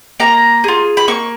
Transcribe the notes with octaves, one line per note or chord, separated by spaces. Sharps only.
A#3 A#5
F4 G#4
B5
A#3 C#6